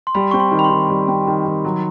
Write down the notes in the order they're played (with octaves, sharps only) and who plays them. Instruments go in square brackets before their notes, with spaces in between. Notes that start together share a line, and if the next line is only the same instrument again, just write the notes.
[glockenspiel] C6
[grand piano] G3 [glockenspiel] B5
[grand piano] C4 [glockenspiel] C#6
[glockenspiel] C6
[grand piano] D#3
[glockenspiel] B5
C6
[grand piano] D#3
G3
C4
D#3
D#3
F#3